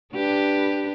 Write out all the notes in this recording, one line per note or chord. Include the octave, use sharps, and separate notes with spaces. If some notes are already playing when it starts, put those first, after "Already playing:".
D4 G4 B4